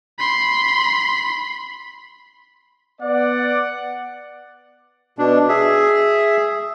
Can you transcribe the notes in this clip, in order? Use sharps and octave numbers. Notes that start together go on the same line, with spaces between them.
B5 C6
B3 D5 F#5
B2 D4
G#4 E5